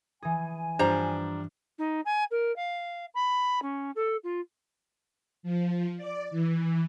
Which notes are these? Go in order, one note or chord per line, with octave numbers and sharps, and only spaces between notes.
E3 G#4 G#5
G2 F3 G3 D4 C5 A#5
D#4
G#5
A#4
F5
B5
C#4
A4
F4
F3
D5
E3